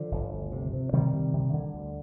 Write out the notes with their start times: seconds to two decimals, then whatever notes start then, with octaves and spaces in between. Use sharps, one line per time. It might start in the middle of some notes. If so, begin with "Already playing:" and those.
Already playing: D3 F3
0.12 G1
0.31 D2
0.52 C3
0.73 C3
0.93 C3 D#3 G3
1.13 C3
1.33 C3
1.54 D3
1.74 D2